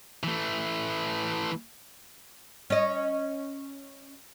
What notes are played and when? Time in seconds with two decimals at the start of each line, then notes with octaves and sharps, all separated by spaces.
0.23 E3 A3
2.70 C#4 D#5